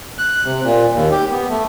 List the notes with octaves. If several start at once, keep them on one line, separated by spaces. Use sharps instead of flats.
F#6
C3
A#2
D#2
G4
B3
A3